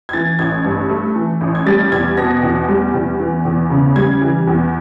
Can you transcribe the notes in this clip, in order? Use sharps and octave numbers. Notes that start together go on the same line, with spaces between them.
G#6
E3 A6
A1 G#6
G2
A3
E3
A1
G#6
G3 A6
E2 G#6
B2 A#6
E2
G3
E2
E3
E2
C#3
G3 G#6
E3
E2